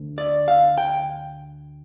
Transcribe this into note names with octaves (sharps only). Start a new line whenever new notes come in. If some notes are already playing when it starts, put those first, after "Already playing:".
Already playing: D2 D3
D5
F5
G5